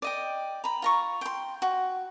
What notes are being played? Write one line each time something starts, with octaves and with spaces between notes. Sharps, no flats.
D5 D#5 G5
A#5 B5
F4 A#5 C#6
G5 C6
F#4